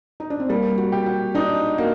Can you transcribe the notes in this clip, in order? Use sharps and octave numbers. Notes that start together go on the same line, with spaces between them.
D#4
D4
C4
G3 A#3
F#4
G4
F#4
D4 D#4
A#3 F#4